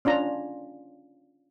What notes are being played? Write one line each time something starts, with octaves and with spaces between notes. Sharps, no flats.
C#4 D4 F4 A#5